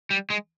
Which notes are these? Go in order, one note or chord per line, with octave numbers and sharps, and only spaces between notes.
G3
G#3